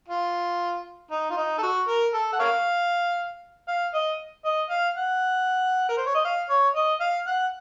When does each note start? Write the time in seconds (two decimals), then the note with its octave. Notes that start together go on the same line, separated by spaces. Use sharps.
0.08 F4
1.11 D#4
1.30 F4
1.37 D#4
1.58 A4
1.63 F#4
1.88 A#4
2.14 A4
2.33 F#5
2.39 A#4 C#5 F5
3.68 F5
3.94 D#5
4.45 D#5
4.70 F5
4.96 F#5
5.89 A#4
5.97 C5
6.06 C#5
6.15 D#5
6.24 F5
6.49 C#5
6.76 D#5
7.01 F5
7.27 F#5